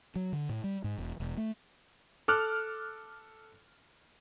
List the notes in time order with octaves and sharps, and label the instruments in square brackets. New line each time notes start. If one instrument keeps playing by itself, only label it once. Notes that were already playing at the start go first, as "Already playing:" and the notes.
[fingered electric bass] F#3
D3
A2
G3
G#2
E1
E1
A3
[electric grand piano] A4 D6 F6 F#6